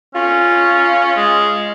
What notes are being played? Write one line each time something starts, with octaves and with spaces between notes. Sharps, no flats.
C#4 F4
G#3